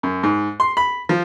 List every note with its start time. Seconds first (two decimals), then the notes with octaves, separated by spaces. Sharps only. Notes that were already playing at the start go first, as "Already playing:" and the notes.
0.03 F#2
0.23 G#2
0.60 C6
0.77 B5
1.09 F3